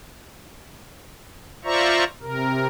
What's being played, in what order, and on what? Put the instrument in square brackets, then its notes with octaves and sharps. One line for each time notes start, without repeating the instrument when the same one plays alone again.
[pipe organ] F4 C5 D5 E5 A#5 C#6
C3 A#4